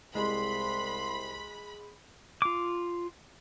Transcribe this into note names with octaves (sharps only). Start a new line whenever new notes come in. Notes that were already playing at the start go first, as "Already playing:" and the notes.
C2 G#3 B5 C6
F4 D6